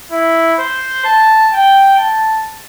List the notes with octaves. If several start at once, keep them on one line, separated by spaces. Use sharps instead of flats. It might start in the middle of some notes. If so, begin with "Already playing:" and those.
E4
C5
A5
G5
A5